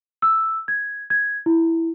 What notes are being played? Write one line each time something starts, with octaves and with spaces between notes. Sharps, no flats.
E6
G#6
G#6
E4